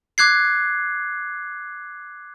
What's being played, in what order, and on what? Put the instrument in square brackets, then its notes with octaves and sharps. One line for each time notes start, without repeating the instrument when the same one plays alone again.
[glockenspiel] D6 F#6 G#6 C7